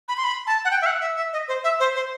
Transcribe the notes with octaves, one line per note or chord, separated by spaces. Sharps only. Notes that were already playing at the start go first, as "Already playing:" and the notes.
B5
C6
B5
A5
F#5
G5
E5
F#5
E5
E5
D#5
C5
E5
C5
C5